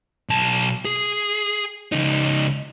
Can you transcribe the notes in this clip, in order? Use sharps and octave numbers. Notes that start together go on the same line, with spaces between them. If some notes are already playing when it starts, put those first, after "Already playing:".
B1 A5
G#4
C#2 D#4